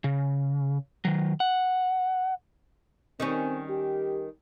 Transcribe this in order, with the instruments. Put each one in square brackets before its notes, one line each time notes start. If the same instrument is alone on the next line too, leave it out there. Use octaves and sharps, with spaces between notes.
[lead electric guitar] C#3
D#3 F#3
F#5
[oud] D#3 G3 C#4 [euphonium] C4
[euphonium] G4